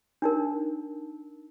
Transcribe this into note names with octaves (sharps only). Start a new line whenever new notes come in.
D4 D#4 A#4